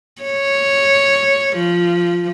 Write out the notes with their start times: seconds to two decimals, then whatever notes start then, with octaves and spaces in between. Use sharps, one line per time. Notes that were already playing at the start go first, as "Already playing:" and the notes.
0.22 C#5
1.57 F3